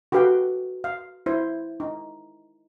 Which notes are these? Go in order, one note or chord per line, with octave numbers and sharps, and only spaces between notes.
F#4 G4 A4 B4 F5 G5
F5
E4 C5
D#4